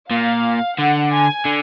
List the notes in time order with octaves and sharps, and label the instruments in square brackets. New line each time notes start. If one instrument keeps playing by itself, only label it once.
[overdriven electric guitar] A#2 [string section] F5
[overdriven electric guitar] D3 [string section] F#5
[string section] G#5
[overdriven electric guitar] D3